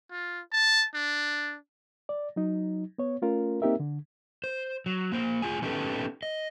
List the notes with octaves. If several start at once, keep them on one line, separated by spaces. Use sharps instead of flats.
F4
A5
D4
D5
F#3 D#4
B3 C#5
A3 C#4 F4 A#4
A#3 C4 D#4 G4 A#4 E5
D3
C5
F#3
A#3 C5
A2 A#3 F4 G#4 G#5
B3 C#4 D#4 G4 A4 B4
D#5